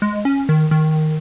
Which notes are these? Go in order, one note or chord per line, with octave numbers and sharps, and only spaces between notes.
G#3
C#4
D#3
D#3